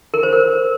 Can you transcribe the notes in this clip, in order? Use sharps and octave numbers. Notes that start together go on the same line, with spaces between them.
A#4
C5
A#4